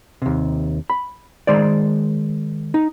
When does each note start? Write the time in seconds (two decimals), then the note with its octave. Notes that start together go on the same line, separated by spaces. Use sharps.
0.22 D#2 C3
0.90 B5
1.47 D#3 G#3 C5 D5
2.74 D#4